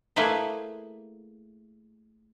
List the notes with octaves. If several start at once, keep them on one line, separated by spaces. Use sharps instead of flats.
A3 A#3 E4 G#4 B4 C5